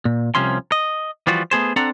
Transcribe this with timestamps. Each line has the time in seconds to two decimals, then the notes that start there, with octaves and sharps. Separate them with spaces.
0.05 A#2
0.35 C2 C3 F3 C#4 C6
0.72 D#5
1.27 E3 F3 G3 F4 F#4
1.51 A3 B3 G#4 C5
1.76 C4 D4 A4 F#5 A#5